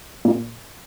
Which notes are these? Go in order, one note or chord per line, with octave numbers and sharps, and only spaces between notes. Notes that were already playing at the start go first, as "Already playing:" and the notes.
A#2